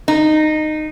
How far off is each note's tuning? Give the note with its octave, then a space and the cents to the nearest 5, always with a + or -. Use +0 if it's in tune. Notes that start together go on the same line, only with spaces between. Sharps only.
D#4 -15